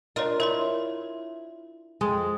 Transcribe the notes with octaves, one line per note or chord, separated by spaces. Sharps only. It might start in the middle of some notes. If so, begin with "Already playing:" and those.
D4 F4 A#4 C#5 D#5
E4 A#4 C#5 C6
F2 G#3